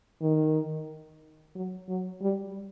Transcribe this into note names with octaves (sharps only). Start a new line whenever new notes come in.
D#3
F#3
F#3
G3